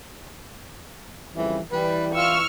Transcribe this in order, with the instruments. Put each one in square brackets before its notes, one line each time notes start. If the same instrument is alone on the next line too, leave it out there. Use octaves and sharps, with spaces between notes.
[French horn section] F2 C#3 G3 [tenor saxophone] E3
[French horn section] E3 [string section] G3 [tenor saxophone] B4
[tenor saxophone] F4 [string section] C#6 E6 F6